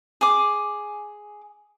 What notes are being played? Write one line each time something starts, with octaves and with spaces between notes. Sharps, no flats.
G#4 D6